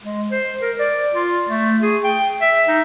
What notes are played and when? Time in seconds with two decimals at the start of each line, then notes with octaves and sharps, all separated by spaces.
0.03 G#3
0.31 C5
0.62 A#4
0.79 D5
1.14 F4
1.49 A3
1.82 G#4
2.04 G5
2.41 E5
2.68 D#4